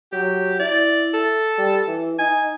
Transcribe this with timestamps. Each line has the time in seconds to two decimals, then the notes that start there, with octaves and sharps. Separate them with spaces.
0.12 F#3 G4
0.60 E4 D5
1.14 A4
1.58 G3
1.87 E3
2.19 D#4 G#5